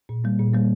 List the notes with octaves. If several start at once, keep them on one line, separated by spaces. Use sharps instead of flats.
A#2
G3 A#3
A#2
G3 A#3